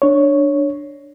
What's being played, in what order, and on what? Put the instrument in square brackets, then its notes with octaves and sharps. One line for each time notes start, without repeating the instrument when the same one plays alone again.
[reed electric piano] D4 C#5